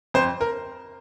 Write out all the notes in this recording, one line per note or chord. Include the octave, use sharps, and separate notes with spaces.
F2 C5
A#4